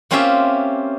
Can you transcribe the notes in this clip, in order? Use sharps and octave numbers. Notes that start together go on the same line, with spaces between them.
A#3 C4 C#4 F4 G4 E5